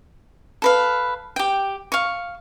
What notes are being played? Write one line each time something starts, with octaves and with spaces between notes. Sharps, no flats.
A4 B4 F5
G4 G5
F5 C#6